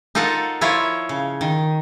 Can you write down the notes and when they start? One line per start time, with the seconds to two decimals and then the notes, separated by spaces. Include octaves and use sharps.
0.15 D#4 F4 A4 A#4 D#5 F#5
0.61 F3 E4 F4 C#5 D#5
1.09 C#3
1.41 D#3